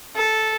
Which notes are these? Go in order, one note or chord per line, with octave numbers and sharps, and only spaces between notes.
A4